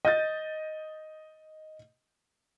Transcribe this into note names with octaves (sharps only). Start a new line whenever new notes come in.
D#5 G6 A6